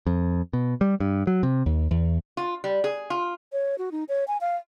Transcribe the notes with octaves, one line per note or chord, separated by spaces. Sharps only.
F2
B2
G3
G2
F#3
C3
D#2
E2
F4
G3
G#4
F4
C#5
F#4
D#4
C#5
G#5
F5